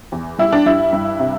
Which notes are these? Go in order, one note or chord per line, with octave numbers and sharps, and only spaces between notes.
E2
G3 E4
D4
G2 E4
G2
C3